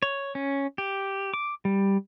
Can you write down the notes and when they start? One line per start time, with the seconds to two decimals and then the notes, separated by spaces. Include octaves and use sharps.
0.03 C#5
0.35 C#4
0.78 G4
1.34 D6
1.65 G3